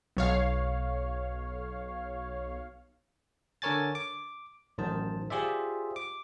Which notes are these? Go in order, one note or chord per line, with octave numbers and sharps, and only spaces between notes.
B1 C#5 F5
D3 A4 A#4 C#5 G#5 A6
D6
A1 F#2 D#3 C5 A5
F4 G4 G#4 C5 D5 E5
D6